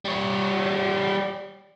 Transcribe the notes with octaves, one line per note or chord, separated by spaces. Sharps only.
G3 C#5